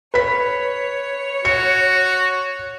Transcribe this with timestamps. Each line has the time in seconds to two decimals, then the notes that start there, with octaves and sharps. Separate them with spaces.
0.14 B4 C#5 B6
1.45 F#4 C#7